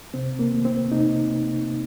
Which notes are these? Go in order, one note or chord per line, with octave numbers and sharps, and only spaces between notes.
C3 C4
A#3
D#3 A3
C4
C3 D#4